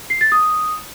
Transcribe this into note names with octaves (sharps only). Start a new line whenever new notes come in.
C7
A6
D#6